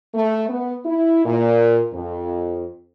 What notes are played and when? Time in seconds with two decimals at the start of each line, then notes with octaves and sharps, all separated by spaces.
0.15 A3
0.49 B3
0.85 E4
1.25 A#2
1.94 F2